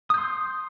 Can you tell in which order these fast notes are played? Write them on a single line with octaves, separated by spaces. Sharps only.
D#6 G6 C6